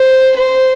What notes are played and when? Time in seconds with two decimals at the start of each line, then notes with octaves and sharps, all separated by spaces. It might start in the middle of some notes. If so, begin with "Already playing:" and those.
Already playing: C5
0.36 C5